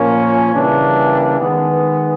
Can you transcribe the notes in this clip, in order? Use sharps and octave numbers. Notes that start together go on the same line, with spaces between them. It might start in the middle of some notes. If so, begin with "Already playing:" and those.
Already playing: A#2 F3 A#3 C#4
C#3 E3 G3 A#3 D4
D#3 G#3 B3